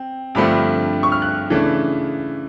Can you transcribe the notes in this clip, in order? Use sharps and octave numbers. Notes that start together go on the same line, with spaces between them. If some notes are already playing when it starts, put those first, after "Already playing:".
Already playing: C4
G2 D3 F3 A3 C4 B5
C#6
F6
F#6
C#3 E3 A3 D4